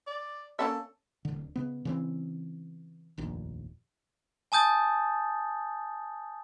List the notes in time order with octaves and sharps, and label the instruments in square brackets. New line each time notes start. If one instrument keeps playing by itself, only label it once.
[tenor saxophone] D5
[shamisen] A#3 C#4 E5 [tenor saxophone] A4
[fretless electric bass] D1 D3
C#3 B3
C#3 E3 C4
F1 A#1 D#2
[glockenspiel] G#5 A5 D#6 G6 A6